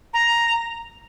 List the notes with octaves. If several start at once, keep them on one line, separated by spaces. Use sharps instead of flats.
A#5